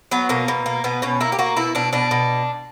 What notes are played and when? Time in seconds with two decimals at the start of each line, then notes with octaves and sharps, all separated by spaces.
0.11 F#3 B3
0.29 B2 A#3
0.48 B2
0.66 A#3
0.84 B2 B3
1.02 B2 C#4
1.20 A#3 E4
1.32 G4
1.39 A#3 F#4
1.57 B2 E4
1.75 B2 D4
1.93 B2 D4
2.11 B2